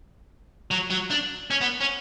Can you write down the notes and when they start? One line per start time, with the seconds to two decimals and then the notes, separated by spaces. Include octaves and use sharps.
0.71 F#3
0.91 F#3
1.11 D4
1.50 C#4
1.61 B3
1.80 C#4